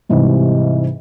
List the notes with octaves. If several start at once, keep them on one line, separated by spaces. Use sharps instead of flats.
G#2 C3 E3 G3